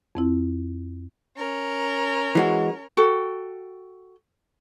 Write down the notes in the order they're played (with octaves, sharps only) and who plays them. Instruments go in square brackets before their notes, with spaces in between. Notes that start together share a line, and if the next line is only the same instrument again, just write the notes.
[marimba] F2 C4 E4
[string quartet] C#4 A#4
[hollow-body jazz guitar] E3 G#3 F#4
[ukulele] F#4 A4 G5